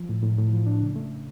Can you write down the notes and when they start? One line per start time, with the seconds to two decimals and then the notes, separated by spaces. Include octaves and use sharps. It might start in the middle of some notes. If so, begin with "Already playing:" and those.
Already playing: F3
0.09 A2
0.23 A2
0.38 A2
0.53 F3
0.67 D4
0.81 C#3
0.96 A3